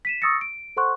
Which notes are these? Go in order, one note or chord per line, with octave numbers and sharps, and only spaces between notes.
B6 D#7 E7
C#6 D#6 E6 A6 A#6 C#7
D7
A4 C5 F#5 C6 C#6 F#6